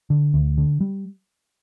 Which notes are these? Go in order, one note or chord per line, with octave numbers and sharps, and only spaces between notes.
D3
D2
D3
G3